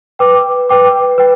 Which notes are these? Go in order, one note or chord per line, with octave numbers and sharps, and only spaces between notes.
B4 G5 D6
B4 G5 D6
B4 G5